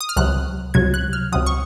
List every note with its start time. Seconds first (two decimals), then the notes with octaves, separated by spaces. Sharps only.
0.01 D#6
0.09 F6
0.17 C#2 C3 F#3 F#6
0.74 C#2 C3 F#3 G#6
0.94 F#6
1.13 F6
1.32 C#2 C3 F#3 D#6
1.46 C#6